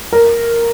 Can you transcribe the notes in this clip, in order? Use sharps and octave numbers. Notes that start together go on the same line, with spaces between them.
A#4